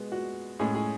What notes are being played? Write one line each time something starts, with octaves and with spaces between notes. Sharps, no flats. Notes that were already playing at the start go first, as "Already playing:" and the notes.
Already playing: B2 G#3 B3
F#4
A2 G#3 C#4 G#4
G#4